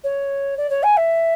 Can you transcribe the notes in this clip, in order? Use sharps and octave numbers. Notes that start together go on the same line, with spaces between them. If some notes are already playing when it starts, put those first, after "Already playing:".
C#5
D5
C#5
G#5
E5